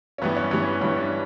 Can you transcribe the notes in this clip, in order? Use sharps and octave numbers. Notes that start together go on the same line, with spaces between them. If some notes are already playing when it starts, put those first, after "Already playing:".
C#4
G2 E3 G3 B3
C#4
G2 E3 G3 C#4
G2 E3 G3 C#4
D4